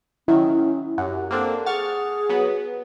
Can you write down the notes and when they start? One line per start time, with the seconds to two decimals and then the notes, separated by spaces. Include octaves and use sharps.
0.28 D#3 F#3 C#4 E4
0.98 F#2 G4 F#5
1.31 A#3 C4 D4 A4
1.66 G#4 F#5 C#6 F6 A6
2.29 F#3 B3